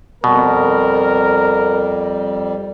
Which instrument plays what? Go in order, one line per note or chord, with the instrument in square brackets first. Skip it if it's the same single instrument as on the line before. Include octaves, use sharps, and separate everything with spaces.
[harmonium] F2 G3 [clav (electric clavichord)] B2 [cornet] A#4